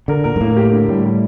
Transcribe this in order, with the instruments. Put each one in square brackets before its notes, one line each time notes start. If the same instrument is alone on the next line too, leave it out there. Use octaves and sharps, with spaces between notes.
[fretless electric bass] D3 [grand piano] A#4
[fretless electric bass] A#2 [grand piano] A#4
[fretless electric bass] G2
[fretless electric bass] A2 [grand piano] A#3
[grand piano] G4
D3
[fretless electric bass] A2 [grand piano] G3
[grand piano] G3